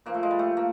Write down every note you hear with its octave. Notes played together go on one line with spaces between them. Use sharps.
A#2 F3 A#3
A3
G#3
G3
A3
A#3